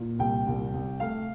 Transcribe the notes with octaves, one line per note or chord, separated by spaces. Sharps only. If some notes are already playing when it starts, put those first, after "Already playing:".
Already playing: A#2 A#3
C2 G5
C2
C2
A3 F5